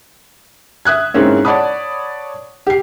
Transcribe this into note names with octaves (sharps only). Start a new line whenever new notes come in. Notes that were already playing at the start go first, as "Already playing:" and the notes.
E5 D#6 F#6 G#6
G#2 A#3 C4 C#4 E4
C#5 D5 F#5 A5 B5 D#6
G4 C7